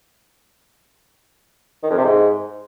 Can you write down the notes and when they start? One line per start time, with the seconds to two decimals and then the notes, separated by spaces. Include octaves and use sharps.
1.83 D#3
1.90 F2
1.97 C3
2.05 G#2